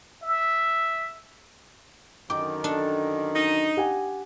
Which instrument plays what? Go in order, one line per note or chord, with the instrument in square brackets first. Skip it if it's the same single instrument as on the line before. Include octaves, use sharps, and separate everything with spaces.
[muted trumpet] E5
[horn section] F#2 D3 D#3 [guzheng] G5 [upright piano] D6
[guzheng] D4 A4
[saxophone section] D#4
[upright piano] G4 F#5 G#5